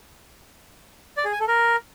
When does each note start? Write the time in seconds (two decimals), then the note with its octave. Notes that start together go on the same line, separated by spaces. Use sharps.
1.17 D5
1.25 G#4
1.32 G#5
1.40 A4
1.48 A#4